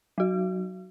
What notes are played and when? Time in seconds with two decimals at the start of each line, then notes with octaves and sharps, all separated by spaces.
0.18 F#3 F#4